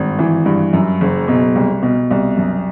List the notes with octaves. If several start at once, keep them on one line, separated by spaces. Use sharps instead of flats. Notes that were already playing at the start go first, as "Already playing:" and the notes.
Already playing: G#1 G2
E3
G2
F#2
F#1
B2
C2
B2
C2
F#2